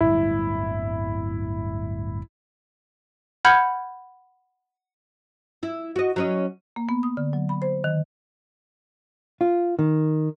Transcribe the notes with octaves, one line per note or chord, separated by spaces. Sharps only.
D1 G1 G3 E4
F#5 B5 F6 G6 G#6 C#7
E4
F#4 D#5
F#3 C#4 D#5
A#3
B3
D#6
D3
F#3
B5
C5
D#3
F4
D#3